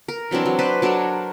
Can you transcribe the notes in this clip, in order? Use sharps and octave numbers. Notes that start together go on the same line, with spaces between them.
A#4
E3 F#3 C4 D4
F#3
B4 C5 D5
F#3 D4 A4 A#4